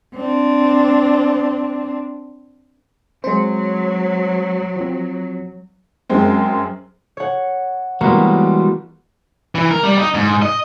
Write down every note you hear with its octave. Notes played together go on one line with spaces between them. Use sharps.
C4 D4
F#3 G#3 C4 C5
F3 C4
F#2 G#3 C4
C#5 F#5
E3 G3 G#3 A#3 B3 F#4
E3
A#4
G3
D#4
G#2
D#5